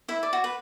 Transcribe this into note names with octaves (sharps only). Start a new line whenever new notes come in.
E4 E5
D5
F#4
B4